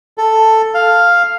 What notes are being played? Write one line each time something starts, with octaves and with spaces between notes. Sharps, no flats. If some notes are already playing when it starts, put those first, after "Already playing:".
A4
F5